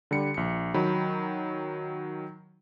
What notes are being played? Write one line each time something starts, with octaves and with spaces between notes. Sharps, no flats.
D3 G3 C#7
A#1 C#7
D#3 F#3 B5